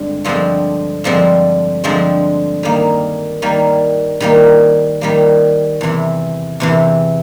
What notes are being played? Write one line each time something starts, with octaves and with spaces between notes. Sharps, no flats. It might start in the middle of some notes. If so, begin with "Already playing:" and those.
Already playing: G2 D3 G#3 C4
G2 D3 F3 G#3 C4
G2 D3 F3 G#3 C4
G2 D3 F3 G#3 C4
D#3 G3 A#3
D#3 G3 A#3
D#3 G3 A#3
D#3 G3 A#3
E2 C3 E3
E2 C3 E3